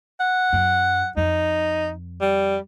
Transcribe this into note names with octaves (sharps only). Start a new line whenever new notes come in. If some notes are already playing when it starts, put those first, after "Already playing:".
F#5
F#2
F2 D#4
G3